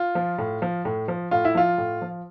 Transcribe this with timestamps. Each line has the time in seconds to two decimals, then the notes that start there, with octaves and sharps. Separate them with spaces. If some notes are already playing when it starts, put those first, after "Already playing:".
Already playing: F4
0.15 F3
0.38 A2
0.62 F3
0.85 A2
1.08 F3
1.31 A2 F4
1.45 E4
1.55 F3 F4
1.78 A2
2.02 F3